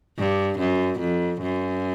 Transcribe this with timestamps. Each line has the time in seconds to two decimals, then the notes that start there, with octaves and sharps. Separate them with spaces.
0.18 G2
0.59 F#2
0.99 F2
1.41 F#2